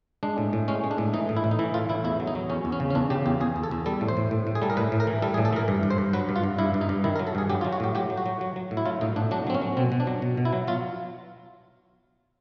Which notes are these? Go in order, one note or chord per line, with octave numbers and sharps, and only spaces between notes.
G#3 D4
A2
A2
G#3 C#4
G#3
D4
A2
E3 D#4
A2
E4
A2
D#4
E3 E4
A2 F4
A2 E4
E2 E4
F#3
D#4
F#3
E2 C#4
E2
C#4
C#3
C#4
E2 D4
C#3 G4
E2 G4
E2 G#4
E2
A4
E2
G3 A4
A2
C5
A2
A2
A2
G#4
G3 A4
A#4
A2 B4
A2
A#4
E3
G3 A4
G#4
A2
A4
E3 A#4
G2
G2
C5
G2
F#3 B4
G2
F4
G2
G2 E4
G2
D#4
G2
D#3 E4
A#4
F#3
A4
G2 G#4
F#3 G4
F4
F#3
F#4
A2 G4
F#3 G4
F#3
F#4
F#3
F#3
F#3
A2
E4
F#3 F4
A2 D#4
A2 D4
F#3 D4
F#3 C4
C#4
F#3
B2 C4
B2
D4
F#3
B2
B2
E4
F#3
F#3 F4